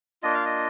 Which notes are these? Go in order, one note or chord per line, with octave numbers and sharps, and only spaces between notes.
A#3 D4 F4 D#5
F5
D#5